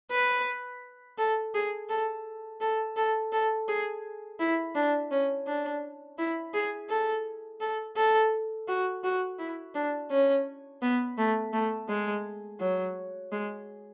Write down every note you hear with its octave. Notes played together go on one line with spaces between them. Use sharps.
B4
A4
G#4
A4
A4
A4
A4
G#4
E4
D4
C#4
D4
E4
G#4
A4
A4
A4
F#4
F#4
E4
D4
C#4
B3
A3
A3
G#3
F#3
G#3